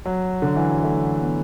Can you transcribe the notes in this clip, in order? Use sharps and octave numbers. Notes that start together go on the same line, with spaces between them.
F#3
D3
E3
F#3
A3
B3